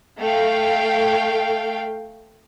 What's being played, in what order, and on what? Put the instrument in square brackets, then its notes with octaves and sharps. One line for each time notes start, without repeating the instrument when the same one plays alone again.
[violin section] A3 F5 G5